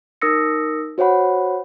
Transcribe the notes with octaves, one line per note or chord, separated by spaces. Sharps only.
D#4 A#4 D#6 E6 A#6 C#7
F#4 C5 C#5 F#5 B5